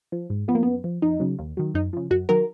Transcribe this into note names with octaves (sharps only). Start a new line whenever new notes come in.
F3
G#2
F3 B3
A#3
F#2 B3
F3
F2 D#4
C#3 F#3
D#2
D#3 F#3
F#2 D#4
C#3 F3
F#2 F#4
D#3 F#3 A#4